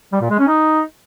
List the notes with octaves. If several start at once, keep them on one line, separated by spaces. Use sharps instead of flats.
G3
A#2
G#3
C#4
D#4